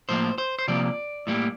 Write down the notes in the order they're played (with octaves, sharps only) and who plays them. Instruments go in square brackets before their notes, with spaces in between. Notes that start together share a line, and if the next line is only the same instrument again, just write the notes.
[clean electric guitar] A2 F3 A#3 C5
C5
C5
C3 F3 A#3 D5
A2 G3 A#3